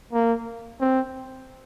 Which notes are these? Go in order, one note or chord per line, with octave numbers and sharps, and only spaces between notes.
A#3
C4